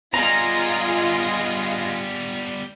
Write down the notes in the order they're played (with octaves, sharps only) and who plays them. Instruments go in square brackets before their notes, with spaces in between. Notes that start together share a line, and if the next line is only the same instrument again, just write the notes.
[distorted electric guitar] G3 B3 [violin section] F4 G#4 D#5 [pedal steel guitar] A#5